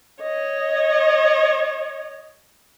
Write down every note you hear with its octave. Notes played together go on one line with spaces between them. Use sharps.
C#5 D#5